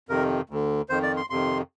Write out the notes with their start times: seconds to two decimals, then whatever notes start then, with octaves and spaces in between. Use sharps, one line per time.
0.09 F2 C3 D#3 A#4
0.50 D2 D3
0.89 F2 D#3 C5
1.03 D5
1.17 C6
1.30 F2 C3 D#3 C6